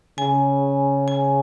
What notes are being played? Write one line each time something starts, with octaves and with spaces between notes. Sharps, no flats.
C#3 G#5
G#5